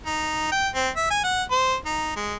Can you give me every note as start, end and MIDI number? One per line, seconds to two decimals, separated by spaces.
0.06 0.47 63
0.52 0.68 79
0.75 0.89 60
0.96 1.10 76
1.10 1.23 80
1.24 1.43 78
1.51 1.75 72
1.86 2.14 63
2.16 2.36 56